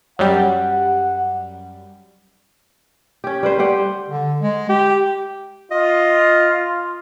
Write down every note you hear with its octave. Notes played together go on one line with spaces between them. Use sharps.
F#2 G3 F#5
C#4 G4
G3 B4 C5
G3 G4 F#5 G5
D3
G#3
G4
F4 D#5